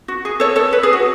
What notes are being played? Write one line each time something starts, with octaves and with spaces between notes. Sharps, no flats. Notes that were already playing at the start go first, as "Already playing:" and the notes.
F#4
G#4
A4 C#5
A4 C#5
B4
G#4
F#4